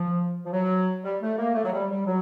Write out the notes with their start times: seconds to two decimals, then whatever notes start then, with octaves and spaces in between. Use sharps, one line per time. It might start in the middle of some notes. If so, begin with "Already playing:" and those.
Already playing: F3
0.45 F3
0.53 F#3
1.04 G3
1.22 A3
1.38 A#3
1.55 A3
1.65 F#3
1.73 G3
1.90 G3
2.06 F#3